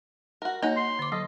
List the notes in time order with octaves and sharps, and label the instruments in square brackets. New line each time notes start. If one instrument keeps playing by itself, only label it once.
[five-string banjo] F#4 A#4
[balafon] A#3 C#5 [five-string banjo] D#4 F#4
[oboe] C6
[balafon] D3 D6
[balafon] F#3 [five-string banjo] A4 [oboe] D#5